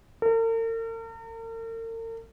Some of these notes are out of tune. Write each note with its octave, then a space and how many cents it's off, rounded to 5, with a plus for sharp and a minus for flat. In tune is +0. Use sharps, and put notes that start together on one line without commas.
A#4 -45